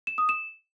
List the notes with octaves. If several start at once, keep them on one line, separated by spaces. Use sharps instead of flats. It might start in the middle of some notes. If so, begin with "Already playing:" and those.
E7
D#6
E7